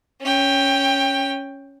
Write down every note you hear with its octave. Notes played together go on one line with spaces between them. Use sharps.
C#4 G5